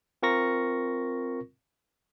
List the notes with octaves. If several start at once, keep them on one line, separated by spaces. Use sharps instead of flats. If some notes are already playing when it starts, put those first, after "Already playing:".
C4 F4 A#4 C#6 A#6 C#7